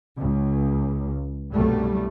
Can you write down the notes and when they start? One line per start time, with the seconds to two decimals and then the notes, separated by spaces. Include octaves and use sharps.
0.19 C#2
1.52 C2 G2 B2 F#3 G3 A3